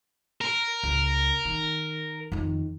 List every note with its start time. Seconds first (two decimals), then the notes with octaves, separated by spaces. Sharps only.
0.41 A#4
0.83 C#2
1.45 D#3
2.32 F2 D#3